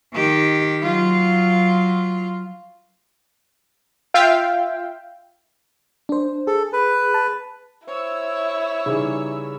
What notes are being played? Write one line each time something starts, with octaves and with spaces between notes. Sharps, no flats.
D#3 G4
F#3 F4
F4 E5 F5 G5
D4 C5
G#4 A4
B4
A5
E4 C5 C#5 E6
C#3 E3 G3 D#4 G#4